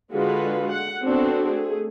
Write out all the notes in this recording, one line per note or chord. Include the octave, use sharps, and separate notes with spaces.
D3 G#3 F4 F#4 B4
F#5
B3 C4 D4 F#4 A4
A3 G#4